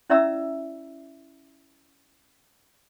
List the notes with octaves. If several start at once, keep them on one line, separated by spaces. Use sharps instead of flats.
C#4 E4 D5 E5 A#5 E6